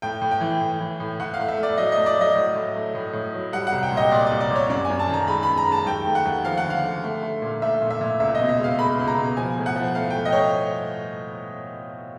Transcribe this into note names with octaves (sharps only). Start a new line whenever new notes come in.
A2 G5
A2
G5
E3
A2
E3
A2
A2 F#5
F5
A3
E5
A3
D5
F#3 D#5
D#5
A3
D5
F#3 D#5
A2
A2
A3
A2
A2
F#3
G3 F#5
C2 F#5
G5
A#2
D#5
A#2 D5
C2 D5
D5
A#2
C#5
F#2 D5
G#5
F#2
A5
D#3 A#5
G#3 B5
B5
F#2
A#5
G#3 A5
D#2 G5
A3
F#5
D#2
F3 F5
F#5
D3
F5
D3
A3
A3
A#2
A3 E5
A#2
E5
A#2
C#2 E5
B2 D#5
E5
G#3 F5
G#3 B5
C#2
A#5
B2
F3 G#5
A2
F#5
F3
A3 F5
G5
A3
D#5
A3 C#5